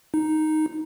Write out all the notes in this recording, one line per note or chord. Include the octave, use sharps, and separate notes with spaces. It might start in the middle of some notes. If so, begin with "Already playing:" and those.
D#4